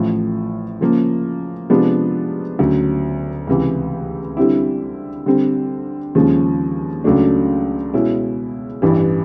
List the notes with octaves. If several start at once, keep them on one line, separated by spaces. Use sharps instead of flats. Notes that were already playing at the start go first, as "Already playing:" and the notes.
Already playing: A1 A2 F3
C#3 F3 A#3
C3 F3 G#3 B3 D4
D2 C#3 F#3
C#2 C3 E3
D3 G3 C4 E4
D3 G3 C4
D#2 C#3 F3 G#3
C#2 C#3 F#3 A3 D4
B2 G#3 C#4 E4
A1 G2 E3 G3